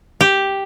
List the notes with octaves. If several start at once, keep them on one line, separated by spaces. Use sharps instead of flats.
G4